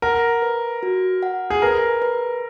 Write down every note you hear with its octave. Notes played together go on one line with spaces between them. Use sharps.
A#4 F#5
B4
F#4
F#5
G#4
A#4 B4
B4